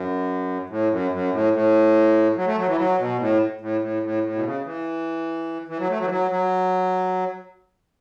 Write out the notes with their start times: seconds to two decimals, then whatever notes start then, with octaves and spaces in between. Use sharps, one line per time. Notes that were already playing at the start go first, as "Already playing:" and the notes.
Already playing: F#2
0.70 A2
0.91 F#2
1.11 F#2
1.32 A2
1.53 A2
2.36 F#3
2.47 A3
2.58 F#3
2.67 E3
2.78 F#3
2.99 B2
3.19 A2
3.61 A2
3.81 A2
4.03 A2
4.23 A2
4.35 B2
4.44 C#3
4.65 E3
5.68 E3
5.79 F#3
5.89 A3
6.00 F#3
6.04 E3
6.10 F#3
6.31 F#3